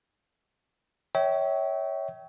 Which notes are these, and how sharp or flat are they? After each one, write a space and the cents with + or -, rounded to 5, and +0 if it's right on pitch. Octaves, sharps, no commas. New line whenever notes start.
C#5 +10 E5 -30 G5 -20